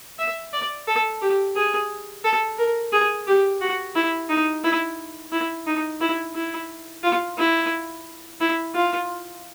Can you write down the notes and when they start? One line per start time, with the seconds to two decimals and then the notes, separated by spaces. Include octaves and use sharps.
0.19 E5
0.53 D5
0.88 A4
1.22 G4
1.56 G#4
2.24 A4
2.59 A#4
2.93 G#4
3.27 G4
3.61 F#4
3.95 E4
4.29 D#4
4.64 E4
5.32 E4
5.67 D#4
6.01 E4
6.35 E4
7.03 F4
7.38 E4
8.41 E4
8.74 F4